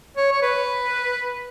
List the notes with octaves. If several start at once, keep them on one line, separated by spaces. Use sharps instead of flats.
C#5
C#5
B4